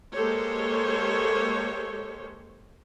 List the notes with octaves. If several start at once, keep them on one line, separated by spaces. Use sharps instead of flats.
G#3 A#3 G4 A4 C5 C#5